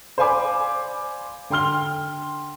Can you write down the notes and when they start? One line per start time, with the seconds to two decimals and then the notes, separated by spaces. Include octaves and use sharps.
0.18 C5 D5 F5 G#5 B5 D6
1.50 D3 G5 C6 F6 G7